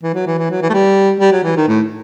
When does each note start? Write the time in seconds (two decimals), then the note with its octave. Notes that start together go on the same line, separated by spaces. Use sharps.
0.03 E3
0.15 F#3
0.27 E3
0.38 E3
0.51 F#3
0.62 E3
0.70 A3
0.73 G3
1.20 G3
1.32 F#3
1.44 E3
1.56 D#3
1.68 A2